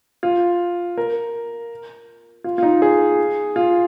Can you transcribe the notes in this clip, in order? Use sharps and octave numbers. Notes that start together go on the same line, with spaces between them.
F4
A#4
F4
F4
D#4
G#4
F4